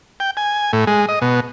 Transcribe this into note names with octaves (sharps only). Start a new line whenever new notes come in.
G5
G#5
A2
G#3
D#5
B2